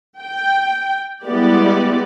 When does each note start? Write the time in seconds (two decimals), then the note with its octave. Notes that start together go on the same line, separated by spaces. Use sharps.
0.20 G5
1.25 G3 G#3 B3 E4 G4 D5